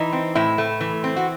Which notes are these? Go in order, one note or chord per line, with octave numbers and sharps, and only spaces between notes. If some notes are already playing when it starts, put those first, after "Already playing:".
Already playing: E3 D#4
C4
A2 E4
A3
E3
C4
F#4